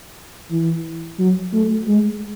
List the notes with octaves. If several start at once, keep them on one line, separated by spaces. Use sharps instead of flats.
E3
F#3
A3
G#3